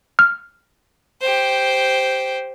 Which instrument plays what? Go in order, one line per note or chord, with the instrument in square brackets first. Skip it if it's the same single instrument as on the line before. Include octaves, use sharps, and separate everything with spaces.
[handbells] F6
[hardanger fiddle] G4 C5